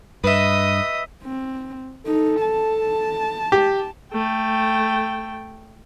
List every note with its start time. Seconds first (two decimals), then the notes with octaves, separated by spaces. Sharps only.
0.24 G2 B4 D#5 E5 D#6
1.23 C4
2.06 D#4 A4
2.41 A5
3.52 G4
4.13 A3 G5